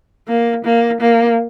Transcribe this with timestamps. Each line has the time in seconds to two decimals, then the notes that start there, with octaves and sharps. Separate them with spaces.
0.28 A#3
0.65 A#3
1.01 A#3